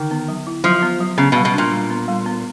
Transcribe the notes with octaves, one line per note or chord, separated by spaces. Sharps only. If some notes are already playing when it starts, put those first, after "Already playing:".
Already playing: D3 D#3
B3
F#3
E4
F3 F#3
B3
F#3
C#3 B3
B2
G3
B2
A#2 D4
G3
B3
G3
B3